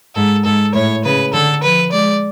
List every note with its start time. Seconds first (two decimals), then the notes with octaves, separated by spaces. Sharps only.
0.15 G#2 A4
0.45 G#2 A4
0.74 A2 C#5
1.04 C#3 B4
1.33 D3 A4
1.63 F3 B4
1.92 G#3 D5